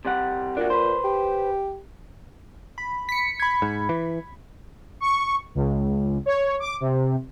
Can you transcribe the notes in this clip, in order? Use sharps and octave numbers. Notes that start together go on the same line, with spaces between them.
C3 G3 F#5
A#2 D4 F#4
B4 C5
G4
B5
B6 C#7
B5 G#6
G#2
E3
C#6
C#2
C#5
D6
C3